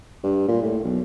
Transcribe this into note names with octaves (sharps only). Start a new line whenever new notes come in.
G2
A#2
A2
B1